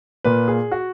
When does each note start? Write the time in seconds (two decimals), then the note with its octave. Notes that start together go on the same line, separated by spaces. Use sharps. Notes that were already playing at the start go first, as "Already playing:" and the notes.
0.24 A#2 A#3 B4
0.48 G#4
0.72 F#4